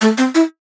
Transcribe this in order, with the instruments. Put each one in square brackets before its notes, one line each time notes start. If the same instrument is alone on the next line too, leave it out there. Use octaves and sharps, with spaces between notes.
[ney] A3
C4
E4